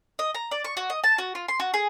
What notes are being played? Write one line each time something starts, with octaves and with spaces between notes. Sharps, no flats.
D#5
A#5
D5
C#6
F#4
D#5
A5
F#4
F4
C6
F#4
G#4